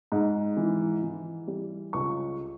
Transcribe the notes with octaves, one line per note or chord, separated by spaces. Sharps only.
G#2
E3
E3
G3
C#2 C#6